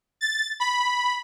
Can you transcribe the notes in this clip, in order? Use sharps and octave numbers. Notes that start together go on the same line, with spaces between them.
A6
B5